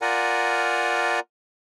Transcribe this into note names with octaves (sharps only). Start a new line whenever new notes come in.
F4 A#4 D5 F#5 G#5 A#5